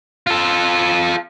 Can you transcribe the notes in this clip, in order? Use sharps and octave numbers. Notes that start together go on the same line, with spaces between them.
F4 A4